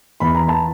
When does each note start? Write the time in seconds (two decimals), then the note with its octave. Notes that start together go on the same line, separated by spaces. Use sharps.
0.20 E2 B5
0.35 A#5
0.48 A5